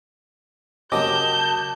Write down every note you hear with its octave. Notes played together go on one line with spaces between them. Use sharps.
C#3 F#3 A#3 G4 D#5 A5 D6 G6